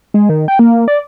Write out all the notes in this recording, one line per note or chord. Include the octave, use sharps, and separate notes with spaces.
G#3
D#3
G5
A#3
D5